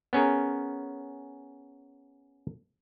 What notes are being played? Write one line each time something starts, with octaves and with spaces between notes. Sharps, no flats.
B3 C#4 G#4 A#4